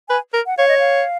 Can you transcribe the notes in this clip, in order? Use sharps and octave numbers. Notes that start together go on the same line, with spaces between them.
B4 G#5
A#4
F#5
C#5 F5
D#5
F5